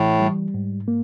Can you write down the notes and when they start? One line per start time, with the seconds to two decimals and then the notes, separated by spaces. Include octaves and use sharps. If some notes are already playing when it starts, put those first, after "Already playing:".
Already playing: A2 E3
0.20 G3
0.54 G#2
0.88 A#3